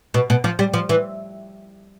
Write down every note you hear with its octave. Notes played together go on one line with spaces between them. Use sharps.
B2
B2
F3
G3
F3
E3